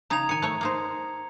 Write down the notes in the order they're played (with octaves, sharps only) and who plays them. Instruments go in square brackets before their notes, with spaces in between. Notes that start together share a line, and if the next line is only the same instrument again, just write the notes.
[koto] C#3 D#4 [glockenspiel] A#5 G#6 F7
[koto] D#3 G#5 [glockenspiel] C#7
[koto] A3 C#5
A#3 D#4 C5